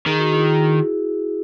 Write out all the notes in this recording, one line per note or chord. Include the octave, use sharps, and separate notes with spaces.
D#3 G#4
F#4
E4 G#4